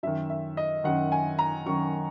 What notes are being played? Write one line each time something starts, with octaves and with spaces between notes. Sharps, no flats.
F#2 D#3 E5
E5
D#5
F#2 D#3 F#5
G#5
A#5
F#2 D#3 C#6